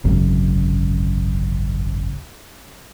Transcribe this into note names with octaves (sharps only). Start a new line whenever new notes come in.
D1 G#1 F#2 C#3